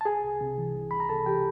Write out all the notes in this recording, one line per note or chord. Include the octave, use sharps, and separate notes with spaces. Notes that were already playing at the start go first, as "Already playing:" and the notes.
A5
C2 G#4 G#5
C2
C3
E3
C2
C2 B5
A#5
C3 A4 A5
E3 G4 G5